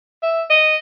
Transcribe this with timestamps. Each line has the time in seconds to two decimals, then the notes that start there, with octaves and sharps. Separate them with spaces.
0.23 E5
0.50 D#5